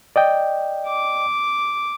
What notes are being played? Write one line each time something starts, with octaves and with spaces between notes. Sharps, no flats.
D5 D#5 G5
D6